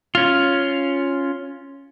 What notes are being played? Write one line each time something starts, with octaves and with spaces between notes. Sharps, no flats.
C#4 F4